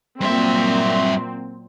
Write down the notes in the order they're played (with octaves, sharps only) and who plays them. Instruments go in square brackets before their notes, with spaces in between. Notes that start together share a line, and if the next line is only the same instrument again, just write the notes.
[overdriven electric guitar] G2 E5 [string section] A#2 F#3 C4